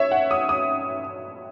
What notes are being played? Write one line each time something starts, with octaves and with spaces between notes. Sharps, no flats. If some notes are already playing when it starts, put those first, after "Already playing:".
Already playing: C#5 E5
F#5
D#6
D#6